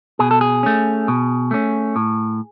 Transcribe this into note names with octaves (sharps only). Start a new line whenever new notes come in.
B2 G#4
A4
G#4
A3 C#4
B2
A3 C#4
A2